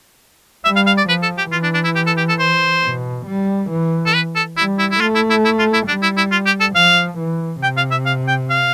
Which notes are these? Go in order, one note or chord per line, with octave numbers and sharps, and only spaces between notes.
G3 E5
F5
F5
D5
F3 B4
A4
G4
E3 F4
D4
D4
E4
G4
A4
G4
A4
C5
B2
G3
E3
A4
B4
A4
G3 E4
E4
E4
A3 F4
E4
E4
E4
F4
E4
G3 D4
E4
E4
F4
G4
A4
F3 F5
E3
C3 G5
F5
E5
F5
G5
F5